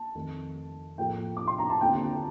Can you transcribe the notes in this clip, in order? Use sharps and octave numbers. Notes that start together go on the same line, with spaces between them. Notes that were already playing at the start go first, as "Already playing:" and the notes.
Already playing: A5
F2 D#3 A3
A2 F3 A#3 F4 A4 G5
D6
C6
A#5
A5
D#2 D3 A3 C4 F4 G5